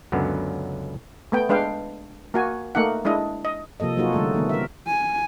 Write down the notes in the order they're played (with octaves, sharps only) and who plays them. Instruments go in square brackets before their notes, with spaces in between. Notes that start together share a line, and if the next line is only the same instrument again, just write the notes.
[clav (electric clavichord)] C#2 F#2 D3 F#3 B3
[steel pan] A3 B3 G5
G#3 D4 B4 F5 G5
A#3 F#4 G#5
A3 A#3 D#4 F#5
G#3 D4 E4 D#5
D#5
[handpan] C3 F3 A#3 A4 D#5
F#3 A#3 D#4 F4 F#4 G#4
D3 G3 A3 A4
D#3 A#3 B3
A#4 E5
[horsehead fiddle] G#5